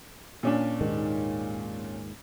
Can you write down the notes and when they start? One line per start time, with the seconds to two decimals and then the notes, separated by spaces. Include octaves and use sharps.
0.43 A#2 C#4 D4
0.81 D#2 G#2 D#3